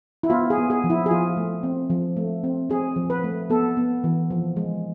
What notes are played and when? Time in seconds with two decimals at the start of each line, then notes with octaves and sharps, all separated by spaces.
0.23 E4
0.30 B3 F4
0.50 G#4
0.58 B3
0.70 G#4
0.84 F3
0.90 E4
1.06 G#4
1.11 F3 F4
1.37 A3
1.63 C4
1.90 F3
2.17 A3
2.44 C4
2.70 C4 G#4
2.96 F3
3.10 B4
3.24 A3
3.50 B3 A4
3.77 B3
4.04 E3
4.30 F3
4.57 G#3